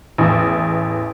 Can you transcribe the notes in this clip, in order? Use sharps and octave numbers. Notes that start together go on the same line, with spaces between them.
A1 E2